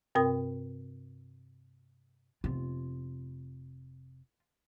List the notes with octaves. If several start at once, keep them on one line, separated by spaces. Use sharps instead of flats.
G2 C3 C4 A#4 G5 D#6
F1 C3 B3 F4